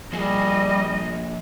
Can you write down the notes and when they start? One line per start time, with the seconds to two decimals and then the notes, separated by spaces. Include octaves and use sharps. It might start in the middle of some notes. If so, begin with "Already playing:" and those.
0.13 F3 G3 A#3 G#4 D#5